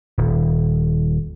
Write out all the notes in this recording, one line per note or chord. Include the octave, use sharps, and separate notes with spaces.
D#1